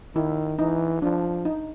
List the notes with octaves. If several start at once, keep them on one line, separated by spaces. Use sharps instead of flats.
D#3 E4
E3 D#4
F3 D4
D#4